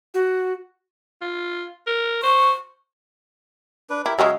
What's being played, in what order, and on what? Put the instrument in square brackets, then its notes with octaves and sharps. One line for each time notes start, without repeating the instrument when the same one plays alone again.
[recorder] F#4
[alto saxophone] F4
A#4
[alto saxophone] C5 [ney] C#6
[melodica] D4 B4
[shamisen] E4 [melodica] G4 A#4
[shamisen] C#3 F#3 G#3 [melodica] G#4 E5 F5